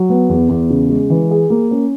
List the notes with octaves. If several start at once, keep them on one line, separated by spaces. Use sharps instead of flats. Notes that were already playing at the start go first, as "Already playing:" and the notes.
Already playing: F#3
B3
E2
E2
C#3
G#3
E3
G#4
A#3
C#4